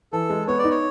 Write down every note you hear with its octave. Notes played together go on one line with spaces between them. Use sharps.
E3 A4
G#3
B3 C#5
D5
D#4
C#5